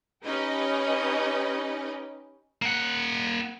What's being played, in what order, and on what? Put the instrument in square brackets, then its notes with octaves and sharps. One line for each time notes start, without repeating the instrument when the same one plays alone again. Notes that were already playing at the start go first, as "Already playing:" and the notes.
[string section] C#4 D#4 G4 B4 D#5
[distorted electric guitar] A#3 F#5